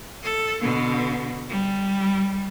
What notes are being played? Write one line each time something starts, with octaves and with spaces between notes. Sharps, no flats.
A4
B2 D3
G3